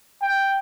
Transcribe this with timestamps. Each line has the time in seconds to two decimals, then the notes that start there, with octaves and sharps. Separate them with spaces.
0.22 G5